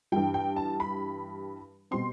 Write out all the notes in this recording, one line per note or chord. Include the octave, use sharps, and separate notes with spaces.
G2 E3 G3 G5
G5
A5
B5
B2 G3 C4 C6